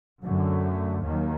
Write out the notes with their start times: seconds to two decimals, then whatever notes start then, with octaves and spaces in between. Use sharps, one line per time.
0.23 F#2 D3 A3
1.03 D#2 D#3 F#3 A#3